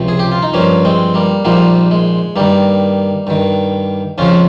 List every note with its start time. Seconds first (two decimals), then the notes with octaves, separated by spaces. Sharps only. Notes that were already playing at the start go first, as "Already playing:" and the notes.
Already playing: C#2 C3 F3
0.08 G#4
0.19 G4
0.32 F4
0.42 D#4
0.53 G2 F3 A#3 C#4
0.85 G#3 C4
1.14 G3 A#3
1.45 A#1 G#2 F3 G3 A#3
1.91 G#3
2.36 G2 D#3 G3 A#3
3.27 G2 D#3
4.18 F2 C#3 F3 C#4 F4